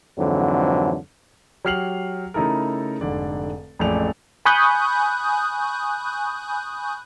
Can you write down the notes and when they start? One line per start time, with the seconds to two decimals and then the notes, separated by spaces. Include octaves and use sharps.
0.18 F2 G#2 D3 E3 F#3
1.65 F#3 G4 F6 C7 F7 F#7
2.34 C#3 A3 D#4 E4 A4 A#4
3.01 F1 G#2 D3 D5
3.79 A1 F2 G#3 A3 D5 F7
4.45 G#5 B5 C#6 D#6 F#6 G6